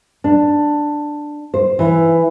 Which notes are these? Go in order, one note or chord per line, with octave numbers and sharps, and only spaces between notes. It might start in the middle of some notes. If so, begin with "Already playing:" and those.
D4
C5
E3